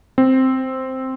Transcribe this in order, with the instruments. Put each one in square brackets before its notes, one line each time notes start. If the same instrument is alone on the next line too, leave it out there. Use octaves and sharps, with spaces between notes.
[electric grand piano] C4